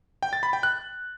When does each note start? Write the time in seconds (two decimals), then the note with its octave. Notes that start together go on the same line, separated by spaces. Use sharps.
0.23 G5
0.33 A6
0.43 B5
0.53 G5
0.63 F#6